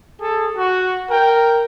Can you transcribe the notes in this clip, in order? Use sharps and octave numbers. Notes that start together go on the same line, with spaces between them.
G#4 A4
F#4
A#4 G5